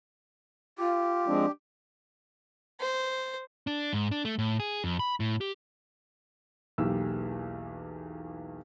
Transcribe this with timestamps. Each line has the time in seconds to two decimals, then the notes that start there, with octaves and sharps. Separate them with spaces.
0.78 F4 G4
1.27 F3 G#3 C4 D4
2.81 C5
3.67 D4
3.93 G#2
4.12 D4
4.25 A3
4.39 A2
4.60 G#4
4.84 F2
4.99 B5
5.20 A2
5.41 G4
6.78 B1 E2 A#3 G4 E6